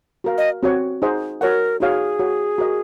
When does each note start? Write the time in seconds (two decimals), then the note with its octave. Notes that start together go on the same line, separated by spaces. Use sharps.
0.24 F#4 A#4 F5
0.38 D#5
0.63 C4 F#4 C#5 F#5
1.02 D#4 G#4 C5 D#5 F#5
1.41 F#4 A#4 C#5 F#5
1.80 D#4 F#4 G#4 C#5 F5
2.19 F#4 C#5 F#5
2.58 F#4 A#4 D#5